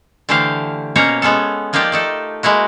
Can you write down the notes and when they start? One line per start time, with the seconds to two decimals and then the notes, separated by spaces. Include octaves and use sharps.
0.29 D3 E3 A3 G4 C5 F5
0.96 B2 A#3 C#4 C5 C#5 A#5
1.22 G#3 B3 C#4 A4
1.73 F3 A#3 D#4 F4 G4 D5
1.92 A3 D#4 A4
2.43 G#3 A#3 E4 F#4